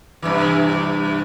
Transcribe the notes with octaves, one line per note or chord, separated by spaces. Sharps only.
G2 C3 E3